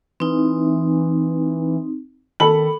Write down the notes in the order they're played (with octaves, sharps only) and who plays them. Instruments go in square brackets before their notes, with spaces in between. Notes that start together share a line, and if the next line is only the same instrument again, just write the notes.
[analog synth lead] E3 [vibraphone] C4 D#4
[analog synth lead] D#3 [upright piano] A4 B5 F#7